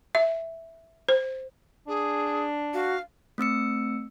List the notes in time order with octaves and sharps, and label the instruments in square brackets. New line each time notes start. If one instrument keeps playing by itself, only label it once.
[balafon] E5
C5
[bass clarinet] D4 [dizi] G#4
[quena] F#4 [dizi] F5
[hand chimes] A3 C4 E6 C#7